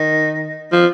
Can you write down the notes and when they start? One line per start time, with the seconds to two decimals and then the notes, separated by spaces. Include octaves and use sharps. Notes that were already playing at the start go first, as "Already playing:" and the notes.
Already playing: D#3
0.72 F3